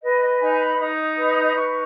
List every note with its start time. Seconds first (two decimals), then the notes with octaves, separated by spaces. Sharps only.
0.03 B4 D#5
0.21 D#5
0.40 D#4 G#5
0.60 B5
0.79 D#4 D#6
1.18 B4
1.56 D#4 C#6